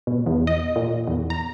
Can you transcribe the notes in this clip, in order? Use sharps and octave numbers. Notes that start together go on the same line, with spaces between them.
B2
E2
D#5
A#2
E2
A#5